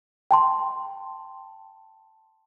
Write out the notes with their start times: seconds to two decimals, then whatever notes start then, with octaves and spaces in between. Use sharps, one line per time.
0.31 G5 A5 C6